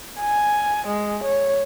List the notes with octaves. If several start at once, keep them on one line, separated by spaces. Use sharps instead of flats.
G#5
G#3
C#5